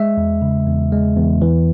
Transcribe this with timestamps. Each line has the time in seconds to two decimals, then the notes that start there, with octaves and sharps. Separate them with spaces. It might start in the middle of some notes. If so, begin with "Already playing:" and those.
Already playing: G#3 E5
0.17 E2
0.42 C#3
0.67 E2
0.92 G#3
1.17 E2
1.42 E3